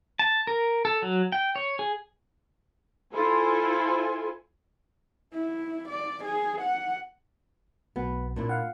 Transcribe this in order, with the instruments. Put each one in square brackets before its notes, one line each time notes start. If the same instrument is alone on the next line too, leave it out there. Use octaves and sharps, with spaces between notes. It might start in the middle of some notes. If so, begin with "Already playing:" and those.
[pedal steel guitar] A5
A#4
A4
F#3
G5
C#5
G#4
[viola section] E4 F4 A4 C5 G#5
[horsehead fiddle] E4
D5
G#4
F#5
[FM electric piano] B1 B2 [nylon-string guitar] B3
[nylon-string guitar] A#2 D4 E4
[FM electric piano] F5 F#5